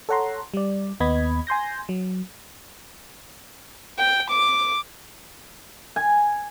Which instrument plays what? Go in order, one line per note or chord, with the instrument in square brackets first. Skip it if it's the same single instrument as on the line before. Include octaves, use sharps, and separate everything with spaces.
[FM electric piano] A4 C#5 F#5 A#5 C6
G3 D5
D#2 B3 D#5 B5 G#6
G#5 C6 G6 A#6
F#3
[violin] G5
D6
[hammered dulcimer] G#5